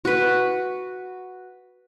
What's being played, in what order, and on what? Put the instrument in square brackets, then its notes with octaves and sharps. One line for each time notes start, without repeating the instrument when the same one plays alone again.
[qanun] F#4 B4